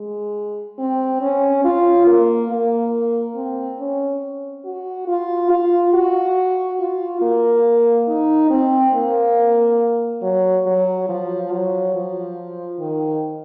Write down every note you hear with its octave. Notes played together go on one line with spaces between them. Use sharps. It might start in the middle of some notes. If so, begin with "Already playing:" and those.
Already playing: G#3
C4
C#4
F4
A#3
A#3
C4
C#4
F#4
F4
F4
F#4
F4
A#3
D#4
C4
A#3
F#3
F#3
F3
F#3
F3
D#3